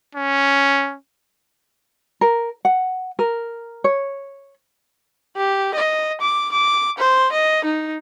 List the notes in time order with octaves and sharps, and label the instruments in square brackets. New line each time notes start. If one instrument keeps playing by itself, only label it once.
[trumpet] C#4
[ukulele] A#4
F#5
A#4
C#5
[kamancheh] G4
D#5
D6
D6
C5
D#5
D#4